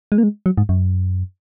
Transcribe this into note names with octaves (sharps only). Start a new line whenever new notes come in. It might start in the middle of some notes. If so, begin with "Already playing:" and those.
G#3
A#3
G#3
F#3
G#2
F#2